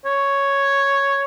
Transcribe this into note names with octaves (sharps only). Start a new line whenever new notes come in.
C#5